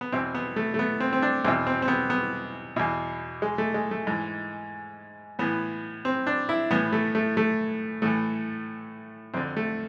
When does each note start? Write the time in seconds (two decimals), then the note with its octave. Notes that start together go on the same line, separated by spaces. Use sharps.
0.01 B3
0.12 E2 B2 C4
0.35 B3
0.56 A3
0.74 A3
0.79 B3
1.00 C4
1.13 C4
1.22 D4
1.45 E2 C4
1.48 B2
1.67 C4
1.82 C4
1.88 B3
2.10 B3
2.76 E2 B2
3.42 G#3
3.58 A3
3.74 G#3
3.91 A3
4.07 G#2 E3
5.39 A2 E3 B3
6.05 C4
6.27 D4
6.49 E4
6.71 A2 E3 B3
6.93 A3
7.15 A3
7.37 A3
8.02 A2 E3 A3
9.34 F2 D3 C4
9.57 A3